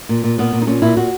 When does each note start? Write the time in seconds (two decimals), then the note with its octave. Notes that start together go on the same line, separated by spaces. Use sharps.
0.09 A#2
0.24 A#2
0.38 A#2 B3
0.53 A#2
0.62 D#4
0.67 A#2 C#4
0.82 A#2 E4
0.97 A#2 F#4